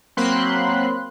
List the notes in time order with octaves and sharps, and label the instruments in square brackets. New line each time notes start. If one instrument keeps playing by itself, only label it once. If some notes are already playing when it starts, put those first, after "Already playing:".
[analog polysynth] F#3 A#3 C4 B5 C6 F#6